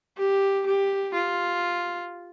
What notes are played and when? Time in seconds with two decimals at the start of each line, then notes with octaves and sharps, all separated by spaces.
0.17 G4
0.66 G4
1.14 F4